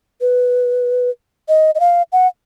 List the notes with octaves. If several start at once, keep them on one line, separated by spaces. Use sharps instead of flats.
B4
D#5
D#5
F5
F#5